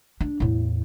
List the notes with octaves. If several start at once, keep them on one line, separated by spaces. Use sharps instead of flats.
D4
E2 A2